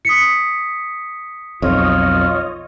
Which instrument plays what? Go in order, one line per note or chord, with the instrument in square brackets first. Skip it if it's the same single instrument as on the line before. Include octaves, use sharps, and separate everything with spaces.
[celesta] D#6 B6 C#7
[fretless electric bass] B1 F2 [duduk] F4 [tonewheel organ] C#5 D#5